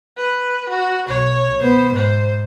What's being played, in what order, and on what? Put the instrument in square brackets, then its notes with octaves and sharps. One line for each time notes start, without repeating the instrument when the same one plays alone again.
[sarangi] B4
F#4
[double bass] B1 [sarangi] C#5
[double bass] B3 [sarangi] C5
[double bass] G#2 [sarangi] C5